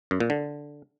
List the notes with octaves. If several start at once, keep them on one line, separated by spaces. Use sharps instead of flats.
F#2
A#2
D3